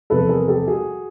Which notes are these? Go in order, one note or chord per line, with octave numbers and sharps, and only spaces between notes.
E2 C3 F3 A4 B4
G#4 A#4
G4 A4
F#4 G#4